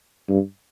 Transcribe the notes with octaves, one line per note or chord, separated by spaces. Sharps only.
G2